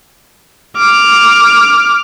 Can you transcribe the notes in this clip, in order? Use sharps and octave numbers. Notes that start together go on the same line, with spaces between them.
D6 F6